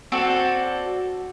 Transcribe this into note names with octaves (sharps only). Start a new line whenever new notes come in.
C4 F#4 A4 D5